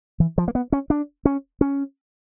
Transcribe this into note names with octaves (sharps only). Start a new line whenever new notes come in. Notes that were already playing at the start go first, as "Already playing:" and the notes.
E3
F3
A#3
B3
C#4
D4
C#4
C#4